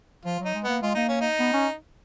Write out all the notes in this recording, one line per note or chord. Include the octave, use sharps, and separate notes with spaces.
F3 F4
F#3
D#4
G#3
A#3 B3
G#3 F4
A#3 D#4
C#4
D#4
B3
C#4